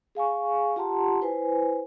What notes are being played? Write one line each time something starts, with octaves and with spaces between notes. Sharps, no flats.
G#4 F5 G#5 C#6
F4 G4 F#5 A5 A#5 C6
E4 B4 C5 G#5